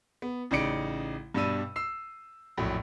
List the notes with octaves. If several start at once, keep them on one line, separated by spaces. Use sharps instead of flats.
B3
A1 C#3 D#4 D5 C#7 D7
G2 B2 G3 D4 E6 D#7
E6 C7
A#1 F2 A2 F#3